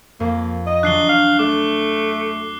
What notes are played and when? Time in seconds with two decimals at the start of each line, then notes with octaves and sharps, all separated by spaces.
0.20 F2 A#3
0.66 D#5
0.83 F#3 D4 F#6 C7 G7
1.09 F5
1.39 A3 D6